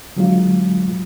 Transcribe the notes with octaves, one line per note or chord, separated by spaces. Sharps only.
D3 F#3 G#3 F4